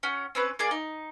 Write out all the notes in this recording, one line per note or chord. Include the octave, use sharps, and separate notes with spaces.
C#4 F#4
C4 C#4 B4
A#3 G#4 D5
D#4